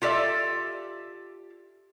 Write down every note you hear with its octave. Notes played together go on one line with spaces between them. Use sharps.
F4 G4 A4 D5 E5